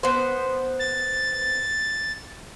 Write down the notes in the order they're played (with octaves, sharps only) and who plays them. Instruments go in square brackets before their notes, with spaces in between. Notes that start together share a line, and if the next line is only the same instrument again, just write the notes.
[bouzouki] B3 C5
[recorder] A6